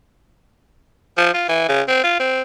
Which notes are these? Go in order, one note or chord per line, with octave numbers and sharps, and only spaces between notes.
F3
F4
E3
C#3
C4
F4
C4